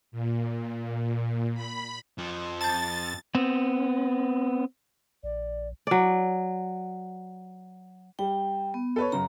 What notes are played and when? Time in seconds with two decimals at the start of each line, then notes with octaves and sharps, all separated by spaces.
0.11 A#2
1.54 B5
2.18 F2 F3
2.61 A5 G6 A6
3.35 B3 C4
5.23 A#1 D5
5.87 F#3 D5
8.19 G3 G5
8.74 B3
8.96 A4 B4 C#5
9.12 F#2 C#3 A#5